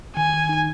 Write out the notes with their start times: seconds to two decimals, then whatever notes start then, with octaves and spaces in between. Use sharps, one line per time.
0.17 D#3 G#5
0.34 D#3
0.49 D#4